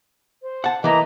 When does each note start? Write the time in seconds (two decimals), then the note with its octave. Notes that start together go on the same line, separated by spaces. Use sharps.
0.42 C5
0.64 F#5 A5
0.84 E3 A#3 B4 D#5 A#5